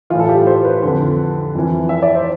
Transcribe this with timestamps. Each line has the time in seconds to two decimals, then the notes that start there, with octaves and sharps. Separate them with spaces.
0.10 A2 E3 F4
0.20 A4
0.29 G4
0.47 C5
0.65 B4
0.82 F2 D3
1.55 F2 E3
1.89 E5
2.02 D5
2.15 C5